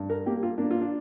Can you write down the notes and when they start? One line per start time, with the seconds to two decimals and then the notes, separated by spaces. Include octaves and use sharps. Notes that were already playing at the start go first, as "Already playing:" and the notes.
Already playing: G2
0.09 A#4
0.26 A#3 G4
0.43 F4
0.58 A#3 D4
0.71 F4
0.81 D4